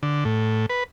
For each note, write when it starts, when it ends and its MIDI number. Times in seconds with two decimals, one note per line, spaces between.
0.03 0.24 50
0.25 0.66 45
0.70 0.84 71